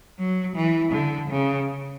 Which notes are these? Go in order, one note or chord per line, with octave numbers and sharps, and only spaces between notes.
F#3
E3
D3
C#3